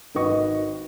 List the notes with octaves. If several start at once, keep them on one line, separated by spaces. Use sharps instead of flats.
G#1 D#3 F#4 B4 D#5 C#6